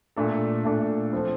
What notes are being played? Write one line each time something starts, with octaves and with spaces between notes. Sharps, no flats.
A#2 A3 D4 A4
A#2 A3 D4 A4
F3 C4 F4 A4